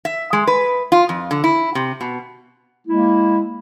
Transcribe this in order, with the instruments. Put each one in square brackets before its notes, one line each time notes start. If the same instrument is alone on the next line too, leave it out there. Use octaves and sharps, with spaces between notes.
[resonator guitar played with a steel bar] E5
G#3
B4
F4
F2
D3
E4
C3
B2
[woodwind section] G#3 A#3 E4